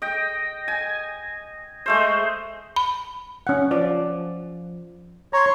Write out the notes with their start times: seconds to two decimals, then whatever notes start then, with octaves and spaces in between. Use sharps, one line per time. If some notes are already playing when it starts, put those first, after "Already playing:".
0.02 D#5 G5
0.68 G#5
1.86 G#3 A3 C5
2.76 B5
3.47 C#4 F#5
3.71 F3 D5
5.33 C#5 A#5 C6